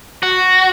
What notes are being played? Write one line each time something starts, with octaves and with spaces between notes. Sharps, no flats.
F#4